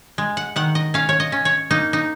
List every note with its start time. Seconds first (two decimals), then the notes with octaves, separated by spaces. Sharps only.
0.18 G#3
0.37 F#5
0.56 D#3 F#5
0.75 D#5
0.94 C#4 F5
1.09 C#5
1.20 D#5
1.32 C#4
1.45 C#5
1.71 A#3 D#4
1.93 D#4